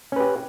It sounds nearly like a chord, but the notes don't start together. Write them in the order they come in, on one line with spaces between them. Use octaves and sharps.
C#4 B4 G4